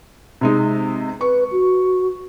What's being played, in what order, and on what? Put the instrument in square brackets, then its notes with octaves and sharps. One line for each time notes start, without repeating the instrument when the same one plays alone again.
[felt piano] C3 G#3 D#4
[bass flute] B4 [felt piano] C#6
[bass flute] F#4